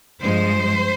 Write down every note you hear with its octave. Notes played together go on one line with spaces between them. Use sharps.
G2 F3 G#3 C5